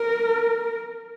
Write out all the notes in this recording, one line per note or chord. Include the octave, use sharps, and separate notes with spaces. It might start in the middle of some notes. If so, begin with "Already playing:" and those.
Already playing: A#4